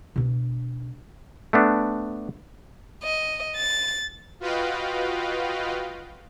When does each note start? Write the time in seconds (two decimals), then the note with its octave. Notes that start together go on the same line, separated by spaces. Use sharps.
0.16 B2 D4
1.53 A3 B3 D4
3.03 D#5
3.56 A6
4.40 F4 F#4 B4 D#5 F5 G5